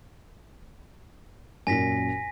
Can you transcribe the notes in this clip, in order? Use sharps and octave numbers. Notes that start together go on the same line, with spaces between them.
F#2 A#2 G#5 A#6 B6